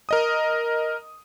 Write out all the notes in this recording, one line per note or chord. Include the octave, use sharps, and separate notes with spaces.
A#4 D#5 D#6